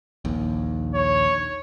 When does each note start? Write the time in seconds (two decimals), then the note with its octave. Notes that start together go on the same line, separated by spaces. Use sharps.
0.25 A#1 D#2
0.94 C#5